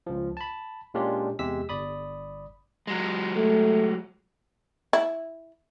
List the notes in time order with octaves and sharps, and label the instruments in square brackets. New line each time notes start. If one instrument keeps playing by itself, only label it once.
[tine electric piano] C#2 F3
A5 B5
A#2 G#3 C#4 D4 F4 G4
E2 C3 G#3 G4 E6 B6
G1 D5 B5 D#6
[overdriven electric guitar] F#3 G#3
[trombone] A3
[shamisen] E4